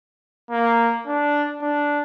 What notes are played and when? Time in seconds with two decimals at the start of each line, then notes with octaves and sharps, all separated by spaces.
0.51 A#3
1.06 D4
1.62 D4